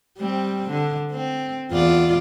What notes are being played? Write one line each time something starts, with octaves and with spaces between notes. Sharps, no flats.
G3 C4
D3
C4
E2 F4 D5